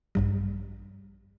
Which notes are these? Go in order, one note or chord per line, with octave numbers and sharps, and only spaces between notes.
A#1 G2 G3